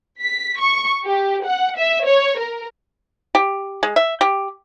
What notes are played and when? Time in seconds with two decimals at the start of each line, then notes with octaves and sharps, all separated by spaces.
0.22 B6
0.60 C#6
1.04 G4
1.45 F#5
1.77 E5
2.06 C#5
2.40 A#4
3.35 G4
3.83 G#3
3.96 E5
4.21 G4